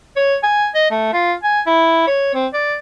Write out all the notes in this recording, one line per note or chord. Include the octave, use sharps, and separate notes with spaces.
C#5
G#5
D#5
A3
F4
G#5
E4
C#5
C4
D5